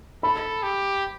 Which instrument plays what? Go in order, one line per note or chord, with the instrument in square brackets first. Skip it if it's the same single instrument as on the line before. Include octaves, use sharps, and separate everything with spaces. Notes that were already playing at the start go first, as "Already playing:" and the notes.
[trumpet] A4 [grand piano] B5
[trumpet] G4